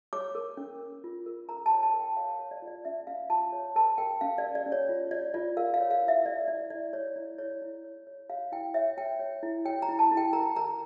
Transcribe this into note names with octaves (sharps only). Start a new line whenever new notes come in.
C#5 D6
A#4
C#4
A#4
F4
A#4
A#4 A#5
A5
C#5
A5
A#4
G5
C#5 F5
C#5
D5
F4
D5
C#4 E5
C#4 F5
F4 A5
C#5
A#4 A5
A#4 G5
C#4 F5
D5
A#4
D5
C#4
C#5
F4
C#5 D5
F4 D5
A#4 F5
F5
C#5
F5
E4
E5
C#5 D5
E4 D5
E4 D5
E4 C#5
E4 D5
E4 C#5
E4
C#5
C#5
C#5 F5
E4 G5
C#5 E5
C#5 G5
C#5
E4
C#5 G5
A#5
E4
A5
E4
G5
A#4 A#5
A#4 A#5